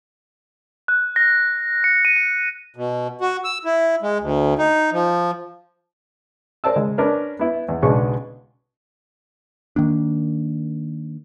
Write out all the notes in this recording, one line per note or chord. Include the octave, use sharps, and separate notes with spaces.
F#6
A#6
C#7
D#7
C#7
B2
F#4
E6
E4
G#3
D2
D#4
F3
A#4 C5 D5 A5 E6
C#3 G#3
C#4 D4 A#4 B4
B3 E4
E2
B1 C#3 G#3 D4 C#6
D#3 A#3 D4